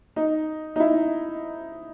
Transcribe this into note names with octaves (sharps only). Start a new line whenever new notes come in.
D#4
D#4
E4